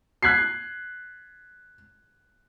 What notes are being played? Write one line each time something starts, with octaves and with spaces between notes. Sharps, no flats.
F#6 G#6 B6 C7